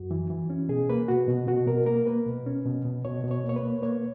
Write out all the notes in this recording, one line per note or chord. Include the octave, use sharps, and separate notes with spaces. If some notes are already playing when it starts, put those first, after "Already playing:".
Already playing: F#2 F#4
E3
E3
C#4
B2 G#4
A#3 B4
B2 F#4
B2
B2 F#4
B2 A#4
A#3 A#4
A#3 B4
B2
C#4
B2
B2
B2 C#5
B2
C#5
A#3
C#5
B4
A#3
A#3 C#5